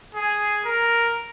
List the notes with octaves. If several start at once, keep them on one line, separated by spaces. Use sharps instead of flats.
G#4
A#4